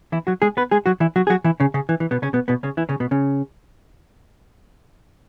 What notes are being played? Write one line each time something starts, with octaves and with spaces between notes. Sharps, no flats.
E3 E4
F#3 F#4
G#3 G#4
B3 B4
G#3 G#4
F#3 F#4
E3 E4
F#3 F#4
G#4
F#3 F#4
E3 E4
C#3 C#4
C#3 C#4
E3
E3
B2 B3
C#3 C#4
B2 B3
B2 B3
C#3 C#4
E3 E4
C#3 C#4
B2 B3
C#3 C#4